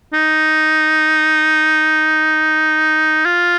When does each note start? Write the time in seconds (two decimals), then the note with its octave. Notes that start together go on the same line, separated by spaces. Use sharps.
0.14 D#4
3.25 F4